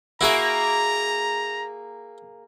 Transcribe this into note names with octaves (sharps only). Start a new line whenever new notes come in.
A#3 E4 F#4 G#4 E5 A#5